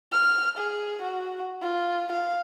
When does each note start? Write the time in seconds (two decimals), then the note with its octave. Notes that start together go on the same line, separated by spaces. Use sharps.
0.12 F6
0.58 G#4
1.02 F#4
1.62 F4
2.12 F5